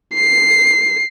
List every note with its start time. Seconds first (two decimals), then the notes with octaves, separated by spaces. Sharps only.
0.15 C7